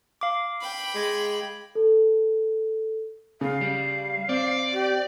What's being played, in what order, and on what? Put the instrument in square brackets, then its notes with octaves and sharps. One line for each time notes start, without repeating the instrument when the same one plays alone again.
[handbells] F5 D6
[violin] G5 B5
[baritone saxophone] G#3
[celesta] A4
[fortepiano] C#3 [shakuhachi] F5
[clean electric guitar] G3
[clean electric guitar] C4 [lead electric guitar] D5
[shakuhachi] G4